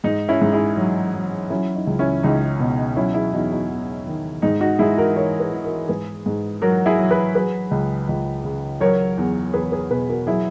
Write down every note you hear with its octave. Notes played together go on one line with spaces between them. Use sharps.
G#2 D#4
C#4 E4
G#2
E4 G#4
F#3
F#3
F#3 C#4 E4
D#4
C#2
C#4 E4
C#2 D#4
B2
F#3 C#4 E4
E4 G#4
E2 D#4 F#4
D#4 F#4
E2
D#3
G#2 D#4
D#4 F#4
G#2 E4 G#4
F#4 A#4
E3 A#4 C#5
G#4 B4
E3
F#4 A#4
G#2 G#4 B4
G#2
F#3 F#4 A#4
E4 G#4
F#3
G#4 B4
F#3 G#4 B4
C#2
C#2
C#3
F#3 A#4 C#5
E2
E2 G#4 B4
G#4 B4
B2 G#4 B4
F#4 A#4
F#3 E4 G#4